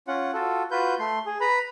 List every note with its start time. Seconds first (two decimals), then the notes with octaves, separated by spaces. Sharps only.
0.08 C#4 F4 F#5
0.34 F4 F#4 A4
0.71 F4 F#4 B4 G6
0.99 A3 C6
1.26 G#4
1.41 B4 A#5 B5